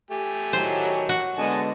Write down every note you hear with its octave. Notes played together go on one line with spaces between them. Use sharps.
A3 G4 G#5
A2 D#3 F#3 C5
F#4
D3 G#3 B3 D#5 G#5 A5